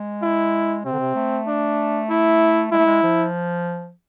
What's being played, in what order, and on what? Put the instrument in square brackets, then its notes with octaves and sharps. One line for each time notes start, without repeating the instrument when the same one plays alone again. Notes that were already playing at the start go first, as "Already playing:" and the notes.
Already playing: [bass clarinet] G#3
[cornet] E4
[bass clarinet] C3 [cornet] C4
[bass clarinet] D3
C3
A3
[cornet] D4
E4
[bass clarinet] G#3 [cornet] E4
[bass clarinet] A3
G#3
F3